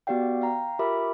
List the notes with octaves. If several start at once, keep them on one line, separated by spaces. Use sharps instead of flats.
B3 F#4 G4 D5 F5 G5
F5 G5 A#5
F4 G4 A#4 E5 B5 D6